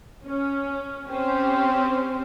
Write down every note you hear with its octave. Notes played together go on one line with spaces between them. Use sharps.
C#4
C4 C#4 G4 C5